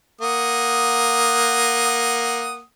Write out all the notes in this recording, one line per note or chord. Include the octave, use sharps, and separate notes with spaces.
A#3 F#5 D#6